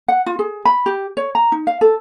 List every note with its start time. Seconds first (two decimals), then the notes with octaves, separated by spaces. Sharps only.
0.08 F#5
0.26 F4
0.39 G#4
0.65 B5
0.86 G4
1.17 C#5
1.35 A#5
1.52 D#4
1.67 F5
1.81 A4